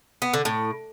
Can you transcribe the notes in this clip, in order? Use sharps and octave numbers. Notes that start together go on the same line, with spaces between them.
B3
D3
A2